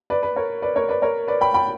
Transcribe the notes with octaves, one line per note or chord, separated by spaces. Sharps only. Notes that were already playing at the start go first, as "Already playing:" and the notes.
B4 D5
B4
A#4 C#5
B4 D5
A#4 C#5
B4 D5
A#4 C#5
B4 D5
G5 B5
G5 B5